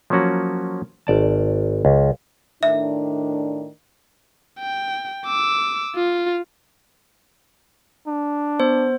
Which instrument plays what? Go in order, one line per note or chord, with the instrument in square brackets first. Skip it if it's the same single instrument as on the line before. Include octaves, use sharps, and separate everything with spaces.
[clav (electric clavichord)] F3 F#3 A#3 C#4 F#4
G#1 D5 A5
C#2
[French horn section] A2 D#3 D4 [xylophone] E5
[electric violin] G5
D6 E6
F4
[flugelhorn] D4
[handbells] B3 C5